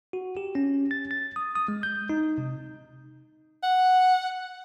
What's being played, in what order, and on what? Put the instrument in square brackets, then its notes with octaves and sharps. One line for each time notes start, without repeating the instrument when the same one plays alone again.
[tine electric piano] F#4
G4
C#4
A6
A6
D#6
D#6
G#3
G6
D#4
C3
[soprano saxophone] F#5